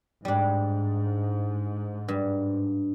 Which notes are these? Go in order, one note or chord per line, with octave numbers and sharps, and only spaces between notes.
G#2 G3 D4
G2